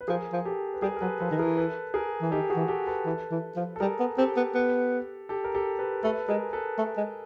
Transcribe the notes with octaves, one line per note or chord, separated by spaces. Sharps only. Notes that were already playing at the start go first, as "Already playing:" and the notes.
B4
F3 G#4 A#4
F3
G4 A4
B4
G3 G#4 A#4
A#4
F#3 A4 B4
F3 A4 B4
D#3
E3 G#4 A#4
A4 B4
G#4 A#4
E3
D#3 G4 A4
F#4 G#4
E3
G4 A4
A4 B4
E3
E3
F3
A4
G3 G#4 A#4
B3
C4 G4 A4
B3
B3
G4 A4
A#4
G4 A4
A4 B4
A3 A4 B4
G#3 G#4 A#4
A4 B4
A3
G#3